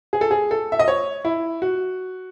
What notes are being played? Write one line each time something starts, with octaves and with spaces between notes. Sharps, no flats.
G#4
A4
G#4
A4
E5
D#5
C#5
E4
F#4